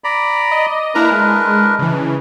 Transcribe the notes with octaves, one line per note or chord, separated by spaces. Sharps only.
D5 A#5 B5
D#5
A#3 D4 E4 A#4 B4 A#5
G#3
C#3 E3